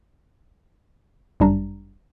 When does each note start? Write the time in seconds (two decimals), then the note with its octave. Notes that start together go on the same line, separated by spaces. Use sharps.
1.40 G1 F#2 G3 D4 A#5